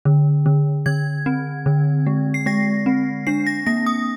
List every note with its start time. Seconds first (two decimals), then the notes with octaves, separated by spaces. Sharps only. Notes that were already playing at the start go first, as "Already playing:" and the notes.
0.05 D3
0.46 D3
0.86 D3 G#6
1.26 C4
1.66 D3
2.07 G#3
2.34 C7
2.46 G#3 A#6
2.86 C4
3.27 D4 C7
3.47 A#6
3.66 A#3 A#6
3.86 D#6